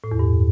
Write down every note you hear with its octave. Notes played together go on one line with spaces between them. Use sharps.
A2
E2
G2